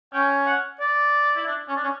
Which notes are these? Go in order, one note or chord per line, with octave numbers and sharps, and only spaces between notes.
C#4 G5
F#5
D5
E4
D4
C#4
D4
C#4